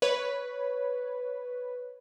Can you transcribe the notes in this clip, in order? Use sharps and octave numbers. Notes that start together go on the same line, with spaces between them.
B4 C#5